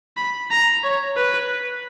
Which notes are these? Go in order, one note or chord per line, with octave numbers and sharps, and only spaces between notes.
B5
A#5
C#5
B4